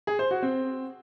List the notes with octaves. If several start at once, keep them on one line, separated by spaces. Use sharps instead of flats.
G#4
C5
F#4
C4